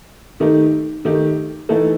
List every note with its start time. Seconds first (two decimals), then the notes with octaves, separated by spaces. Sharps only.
0.40 D#3 A3 D#4 G4
1.05 D#3 A3 D#4 G4
1.69 E3 A3 D#4 A4